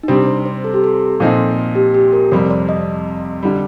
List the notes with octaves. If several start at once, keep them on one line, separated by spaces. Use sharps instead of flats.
D#4
C3 G3 C4 D4
C5
C5
A4
G4
A4
A#2 F3 C4 D#4
G4
G4
A#4
F2 C3 G3 C5
D5
D#5
D3 G3